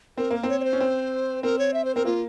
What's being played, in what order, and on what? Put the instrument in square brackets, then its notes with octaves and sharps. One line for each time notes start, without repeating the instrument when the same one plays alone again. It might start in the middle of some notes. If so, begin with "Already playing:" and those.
[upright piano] C4 [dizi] A#4
[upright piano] A#3 [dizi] A#4
[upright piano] C4
[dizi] C#5
C#5
C5
[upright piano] C#4
C4
[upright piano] C4 [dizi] A#4
[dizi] C#5
E5
C5
[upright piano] C4 [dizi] A#4
[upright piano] A#3 [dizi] F4